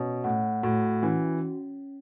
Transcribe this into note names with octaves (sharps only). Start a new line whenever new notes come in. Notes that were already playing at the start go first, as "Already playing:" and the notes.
Already playing: B2 C#4 C#5
A2 F#5
A2 F#4
E3 C#4